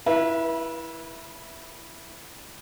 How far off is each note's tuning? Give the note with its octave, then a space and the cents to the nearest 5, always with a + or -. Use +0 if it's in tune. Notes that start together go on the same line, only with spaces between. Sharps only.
E4 +0 B4 -30 E5 +5